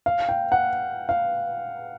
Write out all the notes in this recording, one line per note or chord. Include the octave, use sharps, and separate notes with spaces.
F5
G5
F#5
F5